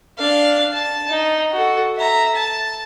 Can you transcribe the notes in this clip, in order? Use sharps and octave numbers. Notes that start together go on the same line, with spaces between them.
D4 F5
A5
D#4
F#4 A4
E5 A#5
A5